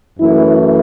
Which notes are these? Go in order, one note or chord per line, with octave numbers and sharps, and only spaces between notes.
F#2 E3 A3 E4